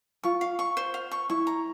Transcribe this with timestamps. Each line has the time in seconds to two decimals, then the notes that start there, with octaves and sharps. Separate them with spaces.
0.24 F4 C#6
0.41 F5
0.59 C#6
0.77 C5
0.94 F5
1.11 C#6
1.30 E4 C#6
1.47 A#5